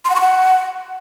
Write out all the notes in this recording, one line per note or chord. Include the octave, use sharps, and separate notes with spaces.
C6
F#5
C#6
F#5